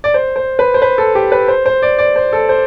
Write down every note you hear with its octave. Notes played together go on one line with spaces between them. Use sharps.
D5
C5
C5
B4
C5
B4
A4
G4
B4
C5
C5
D5
D5
C5
A4
C5